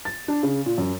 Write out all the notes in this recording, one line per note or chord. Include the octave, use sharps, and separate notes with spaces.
A6
D4
C#3
A#2
F#2